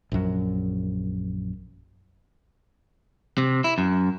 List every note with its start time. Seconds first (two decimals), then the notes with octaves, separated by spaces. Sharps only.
0.12 A#1 F#2
3.38 C3
3.64 E4
3.78 F#2